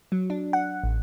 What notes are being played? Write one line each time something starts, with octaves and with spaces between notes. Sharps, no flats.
F#3
D4
F#5
A1